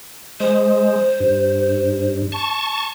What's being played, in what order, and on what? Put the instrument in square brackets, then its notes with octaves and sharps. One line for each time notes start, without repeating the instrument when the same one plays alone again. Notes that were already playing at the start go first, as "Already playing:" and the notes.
[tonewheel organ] G#3 [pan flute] C5
[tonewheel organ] G2
A5 C#6